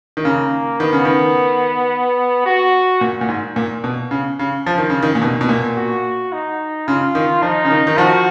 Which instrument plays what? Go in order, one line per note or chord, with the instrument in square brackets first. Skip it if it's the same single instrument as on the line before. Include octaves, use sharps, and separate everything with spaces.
[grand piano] D#3
[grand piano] C#3 [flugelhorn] A#3
[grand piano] D#3 [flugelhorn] B3
[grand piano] C#3
D#3
[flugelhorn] F#4
[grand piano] A#2
A#2
G#2
A#2
B2
C#3
C#3
F3
D#3
C#3
D#3
A#2
B2
B2
A#2
[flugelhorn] F#4
D#4
[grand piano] C#3 [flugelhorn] F4
[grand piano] D#3
[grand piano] F3 [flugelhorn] D#4
[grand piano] C#3
D#3
D#3
[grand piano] F3 [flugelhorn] F#4